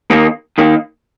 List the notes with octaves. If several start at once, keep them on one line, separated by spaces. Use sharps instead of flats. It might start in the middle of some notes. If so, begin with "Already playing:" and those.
D#2 D#3 A#3
D#2 D#3 A#3